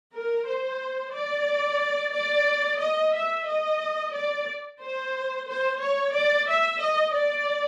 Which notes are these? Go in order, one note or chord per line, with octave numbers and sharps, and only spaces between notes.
A#4
C5
D5
D5
D#5
E5
D#5
D5
C5
C5
C#5
D5
E5
D#5
D5